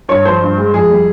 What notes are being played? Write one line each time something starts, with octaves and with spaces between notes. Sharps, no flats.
G2 C#5
F3 C5
G2
G#3
F2 G#4
G3